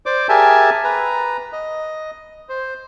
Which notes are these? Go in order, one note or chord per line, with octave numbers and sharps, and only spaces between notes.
C5 D5 D6
G4 G#4 A#4 E5 G#5 A5
B4 A#5
D#5
C5